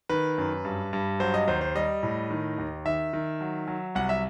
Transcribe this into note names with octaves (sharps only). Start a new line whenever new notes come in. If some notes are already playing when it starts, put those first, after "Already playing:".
D#3 B4
F#2
G2
G2
F#3 C5
D#5
D#2 C5
C5
G3 D#5
A2
D#3
D#2
D#3 E5
D#3
F#3
F#3
C2 F#5
E5